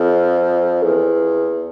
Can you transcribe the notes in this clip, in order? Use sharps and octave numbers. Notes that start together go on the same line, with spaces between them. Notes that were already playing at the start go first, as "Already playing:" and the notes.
Already playing: F2
E2